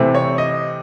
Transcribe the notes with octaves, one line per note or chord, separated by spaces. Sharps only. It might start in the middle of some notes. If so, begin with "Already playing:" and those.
Already playing: C3 E3 A3 C4
C#5
D#5